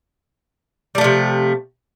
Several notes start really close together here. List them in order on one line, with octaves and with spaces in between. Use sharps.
G3 A3 F3 C3